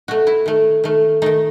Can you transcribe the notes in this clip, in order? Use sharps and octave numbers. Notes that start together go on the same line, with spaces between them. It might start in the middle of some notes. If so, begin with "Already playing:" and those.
B2 A3 F#4
E4
D#3 A3
D#3 A3
D#3 A3 D#4